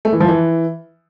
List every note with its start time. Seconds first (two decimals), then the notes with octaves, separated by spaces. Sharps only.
0.05 A3
0.13 E3
0.20 F3
0.28 E3